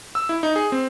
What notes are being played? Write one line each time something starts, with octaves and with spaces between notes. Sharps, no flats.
E6
E4
D#4
G#4
C4